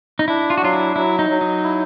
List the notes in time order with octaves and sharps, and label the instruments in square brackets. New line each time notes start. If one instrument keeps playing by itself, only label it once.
[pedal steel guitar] D#4
[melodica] D4 [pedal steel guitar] E4
[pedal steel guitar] F4
F#4
[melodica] F#3 [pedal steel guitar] F4
[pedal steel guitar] E4
[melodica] F#3 [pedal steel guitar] E4
[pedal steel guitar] D#4
[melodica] F#3
[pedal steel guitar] D#4
[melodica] E4